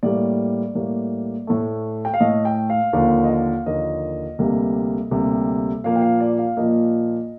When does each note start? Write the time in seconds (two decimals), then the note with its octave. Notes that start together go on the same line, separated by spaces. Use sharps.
0.03 A2 G3 A#3 D5
0.75 A2 G3 A#3
1.47 A2 A3
2.05 G5
2.14 F5
2.20 A2 A3 D#5
2.45 G5
2.70 F5
2.93 D#2 D3 F3 A#3 F5
3.24 D#5
3.29 F5
3.66 D#2 D3 F3 A#3 D#5
4.39 D2 C3 G3 A#3
5.11 D2 C3 G3 A#3
5.84 A#2 F3 A#3 F5
5.96 G5
6.02 F5
6.21 D5
6.38 F5
6.57 A#2 F3 A#3 D#5